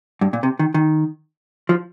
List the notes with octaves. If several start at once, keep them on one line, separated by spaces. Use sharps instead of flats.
G2
A#2
C3
D#3
D#3
F3